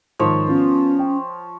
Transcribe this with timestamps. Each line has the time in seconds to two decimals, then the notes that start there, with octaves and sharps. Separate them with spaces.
0.19 G#2 D#3 F3 C#5
0.48 B3 C#4 F4
0.99 G5